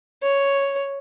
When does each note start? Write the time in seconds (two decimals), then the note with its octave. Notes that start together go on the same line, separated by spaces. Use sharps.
0.22 C#5